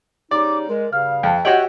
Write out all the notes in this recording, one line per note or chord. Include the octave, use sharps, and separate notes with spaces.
C#3 G3 D#4 D5 D6
G#3 A#4
G2 C#3 F5 F6
F2 G5 A5
F#4 G4 C#5 D#5 E5 F#5 G5 F#7